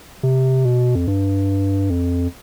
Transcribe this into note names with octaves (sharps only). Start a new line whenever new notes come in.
C3
B2
F2
G2
F2